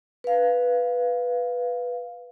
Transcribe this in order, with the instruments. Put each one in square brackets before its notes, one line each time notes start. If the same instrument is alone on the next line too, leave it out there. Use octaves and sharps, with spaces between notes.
[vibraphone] B4 F5